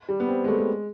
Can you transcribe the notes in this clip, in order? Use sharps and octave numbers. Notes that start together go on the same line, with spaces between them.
G3
B3
C4
G#3
A3
G#3